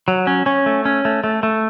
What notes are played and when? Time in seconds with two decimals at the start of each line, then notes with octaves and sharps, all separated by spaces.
0.08 F#3
0.27 C#4
0.46 C#4
0.66 A3
0.85 C#4
1.05 A3
1.24 A3
1.43 A3